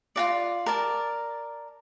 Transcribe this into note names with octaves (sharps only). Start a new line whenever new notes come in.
F4 F#4 D5
A#4 D5 A5